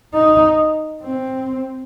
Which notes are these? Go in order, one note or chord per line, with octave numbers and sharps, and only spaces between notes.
D#4
C4